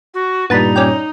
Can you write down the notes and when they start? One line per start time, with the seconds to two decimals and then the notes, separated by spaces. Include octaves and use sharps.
0.14 F#4
0.50 G2 A#2 G3 B3 D#4 A5 B5
0.76 C#4 D5 G5